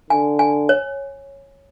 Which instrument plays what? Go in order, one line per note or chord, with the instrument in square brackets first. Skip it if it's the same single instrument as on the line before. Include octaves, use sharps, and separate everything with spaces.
[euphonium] D3 [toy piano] G#5
[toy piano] G#5
C#5